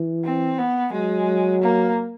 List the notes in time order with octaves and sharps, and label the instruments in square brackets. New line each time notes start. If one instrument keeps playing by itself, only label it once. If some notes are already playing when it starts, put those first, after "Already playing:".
Already playing: [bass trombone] E3
[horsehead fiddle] C4
B3
[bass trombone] F#3 [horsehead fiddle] G#3
[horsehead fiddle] A#3